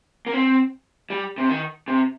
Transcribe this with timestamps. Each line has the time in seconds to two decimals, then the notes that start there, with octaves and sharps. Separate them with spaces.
0.27 A#3
0.33 C4
1.10 G3
1.38 C3
1.49 D#3
1.88 C3